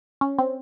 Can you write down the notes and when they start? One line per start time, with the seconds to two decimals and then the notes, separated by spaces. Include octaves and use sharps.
0.21 C#4
0.39 C4